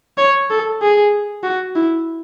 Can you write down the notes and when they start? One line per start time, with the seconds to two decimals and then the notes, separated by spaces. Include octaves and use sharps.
0.18 C#5
0.50 A4
0.82 G#4
1.44 F#4
1.76 E4